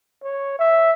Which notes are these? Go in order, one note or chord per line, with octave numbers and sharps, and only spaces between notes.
C#5
E5